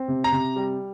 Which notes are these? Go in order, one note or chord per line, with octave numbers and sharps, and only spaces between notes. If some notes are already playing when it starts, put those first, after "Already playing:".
Already playing: C4
C3
A#5
C3
G3